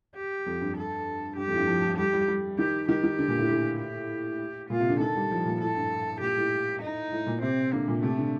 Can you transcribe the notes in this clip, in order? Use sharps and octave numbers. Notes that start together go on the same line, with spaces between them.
G4
F2
G2
A4
G2 G4
F2
A2
G2
F3
F3
G3 G4
G3
G3
D#3 G4
D#3 G4
D#3
D3
A#2
A2
A2
G4
A#2 F4
C3
D3
D#3 A4
G3
F3
A#2
A2 A4
G2
A#2 G4
A2
D#4
A2
A#2
C3 C4
D3 A#3
A#2
C3 A3
D3